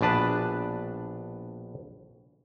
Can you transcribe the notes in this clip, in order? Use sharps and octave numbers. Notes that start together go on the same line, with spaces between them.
A#1 B2 D4 B4 A5